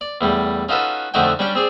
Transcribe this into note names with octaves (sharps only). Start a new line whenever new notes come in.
D5
E2 A2 G3
C#4 D#4 F4 F#4 A4 B4
F2 D3 A3 D#4 F#4 G5
G3 C#4 D4 G5
C4 G#4 D5